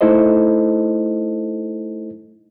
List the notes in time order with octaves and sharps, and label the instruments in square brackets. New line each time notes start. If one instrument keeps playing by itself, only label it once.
[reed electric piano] A3 D#4 E4 A4 C5 D#5